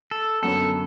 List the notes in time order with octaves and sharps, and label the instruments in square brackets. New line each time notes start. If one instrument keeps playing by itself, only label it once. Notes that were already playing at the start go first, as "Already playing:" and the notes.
[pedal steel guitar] A4
[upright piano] F#2 D3 F#3 B3 [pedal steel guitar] A4